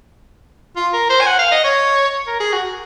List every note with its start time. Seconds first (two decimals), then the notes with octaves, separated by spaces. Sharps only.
0.76 F4
0.93 A#4
1.09 C5
1.21 G#5
1.27 F#5
1.39 F5
1.52 D#5
1.64 C#5
2.27 A#4
2.40 G#4
2.52 F#4